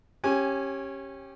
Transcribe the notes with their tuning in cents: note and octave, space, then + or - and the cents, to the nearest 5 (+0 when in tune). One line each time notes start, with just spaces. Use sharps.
C#4 -20 G4 +0 G#5 +0